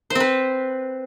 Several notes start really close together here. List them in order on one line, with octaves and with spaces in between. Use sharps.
C5 C4 B4